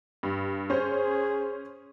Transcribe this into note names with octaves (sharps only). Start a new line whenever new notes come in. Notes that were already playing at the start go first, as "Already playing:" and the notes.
G2
C#4 G#4 C5